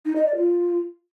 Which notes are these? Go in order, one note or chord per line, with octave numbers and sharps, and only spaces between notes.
D#4
D#5
D5
F4